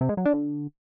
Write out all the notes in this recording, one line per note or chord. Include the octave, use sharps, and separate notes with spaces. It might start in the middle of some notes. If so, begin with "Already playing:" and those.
C3
G#3
F#3
D4
D3